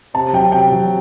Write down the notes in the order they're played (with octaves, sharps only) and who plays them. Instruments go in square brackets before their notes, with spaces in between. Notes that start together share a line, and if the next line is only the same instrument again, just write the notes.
[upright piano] C3 A5
F#3 G5
C3 G5
F#3